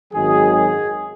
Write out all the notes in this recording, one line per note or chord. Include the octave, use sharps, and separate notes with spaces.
G#1 F#2 D#3 F#3 G#4
G#4